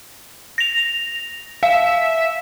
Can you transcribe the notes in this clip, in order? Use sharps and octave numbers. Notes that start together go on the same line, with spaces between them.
A#6 F7
E5 F5